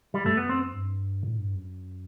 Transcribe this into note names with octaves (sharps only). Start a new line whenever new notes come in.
G3
F#2 A3
B3
C4
G2
A2
G2
F#2